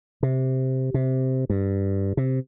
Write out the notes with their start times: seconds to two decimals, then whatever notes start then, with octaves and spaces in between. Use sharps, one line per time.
0.23 C3
0.94 C3
1.50 G2
2.17 C3